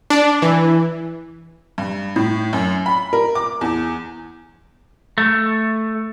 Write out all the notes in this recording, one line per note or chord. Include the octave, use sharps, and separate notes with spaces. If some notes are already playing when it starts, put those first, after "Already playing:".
D4
E3
G2
A2
F#2
B5
A#4
D6
E2
A3